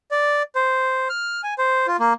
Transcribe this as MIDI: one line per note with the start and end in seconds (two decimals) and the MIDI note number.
0.11 0.42 74
0.55 1.08 72
1.10 1.41 89
1.43 1.54 80
1.58 1.87 72
1.87 1.97 65
2.00 2.13 58